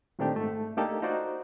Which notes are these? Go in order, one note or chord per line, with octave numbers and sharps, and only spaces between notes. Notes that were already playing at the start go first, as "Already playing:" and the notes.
A#2 D#3 A3 C4 D4 G4
G#2 A3
A3 A#3 D4 D#4 G4 A4
D#4 F4 F#4 C5 D5